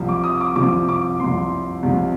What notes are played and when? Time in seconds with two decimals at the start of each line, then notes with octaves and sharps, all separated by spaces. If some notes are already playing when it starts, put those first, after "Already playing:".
Already playing: C2 C3 F3
0.09 D6
0.24 D#6
0.41 D6
0.56 C2 C3 F3 D6
0.89 D6
1.20 C2 C3 F3 C6
1.83 C2 C3 F3